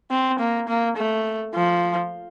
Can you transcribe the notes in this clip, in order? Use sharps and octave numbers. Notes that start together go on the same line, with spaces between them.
C4
A#3
A#3
A3
F3